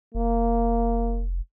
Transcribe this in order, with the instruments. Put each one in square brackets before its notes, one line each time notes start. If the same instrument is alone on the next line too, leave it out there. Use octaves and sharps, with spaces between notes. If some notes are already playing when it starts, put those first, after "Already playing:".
[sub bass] F1 [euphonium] A#3